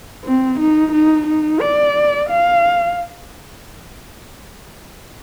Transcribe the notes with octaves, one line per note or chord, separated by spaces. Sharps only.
C4
D#4
D#4
D#4
D5
F5